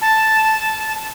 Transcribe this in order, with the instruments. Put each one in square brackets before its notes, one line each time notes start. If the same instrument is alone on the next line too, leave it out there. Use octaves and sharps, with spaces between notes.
[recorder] A5